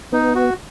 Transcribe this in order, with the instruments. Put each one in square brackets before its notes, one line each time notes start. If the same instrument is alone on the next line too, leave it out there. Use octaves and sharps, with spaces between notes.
[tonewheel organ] B3 [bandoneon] D#4
[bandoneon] F#4